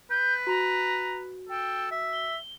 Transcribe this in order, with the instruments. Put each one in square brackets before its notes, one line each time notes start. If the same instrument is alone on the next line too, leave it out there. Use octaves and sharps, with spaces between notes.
[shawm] B4 [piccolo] G6
[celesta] F#4 [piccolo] A#5
[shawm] A4 [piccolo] G5
[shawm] E5
[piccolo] G7